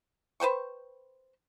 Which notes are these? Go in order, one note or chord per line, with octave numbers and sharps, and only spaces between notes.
B4 C5 G5 C#6